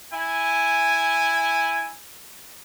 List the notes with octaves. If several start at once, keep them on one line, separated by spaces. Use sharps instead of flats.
E4 G#5